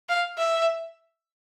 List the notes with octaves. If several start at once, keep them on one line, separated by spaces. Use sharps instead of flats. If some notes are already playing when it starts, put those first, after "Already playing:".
F5
E5